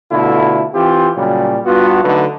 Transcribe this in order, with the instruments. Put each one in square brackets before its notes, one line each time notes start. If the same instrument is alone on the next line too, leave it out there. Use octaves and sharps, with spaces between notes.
[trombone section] B2 D3 A3 E4 F4
E3 C4 F4 G4
A#2 C#3 F#3 G3
G2 B3 F4 F#4
D3 F#3 A3 D#4 B4